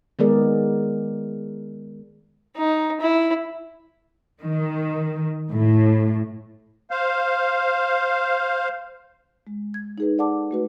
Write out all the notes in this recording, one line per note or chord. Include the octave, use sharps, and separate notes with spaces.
D#3 G#3 B3 G#4 A#4 D5
D#4
E4
D#3
A2
C5 F5
G#3
G#6
D#4 G#4 B4
A4 D5 F#5 A5 D6
A3 F#4 B4